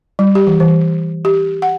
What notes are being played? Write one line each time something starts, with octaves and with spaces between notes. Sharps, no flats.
G3
G4
E3
E3
G4
F#5